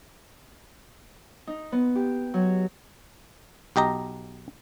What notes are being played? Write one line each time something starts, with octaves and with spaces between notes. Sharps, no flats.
D#4
B3
G4
F#3
B1 G4 D#5 A#5